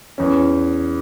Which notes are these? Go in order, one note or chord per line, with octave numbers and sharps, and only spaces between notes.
E2 E3 C#4